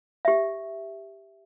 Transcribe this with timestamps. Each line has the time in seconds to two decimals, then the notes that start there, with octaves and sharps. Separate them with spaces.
0.25 G4 E5